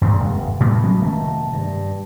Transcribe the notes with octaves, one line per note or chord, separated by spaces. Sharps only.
G2 A#2 D#3 G#3
F1
A2 G3 A3 B3
F#3 G#3 B3 C#4
F1 D#3 A3 A#3
G2